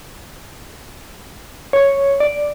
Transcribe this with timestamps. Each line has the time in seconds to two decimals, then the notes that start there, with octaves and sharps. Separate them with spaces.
1.73 C#5
2.20 D5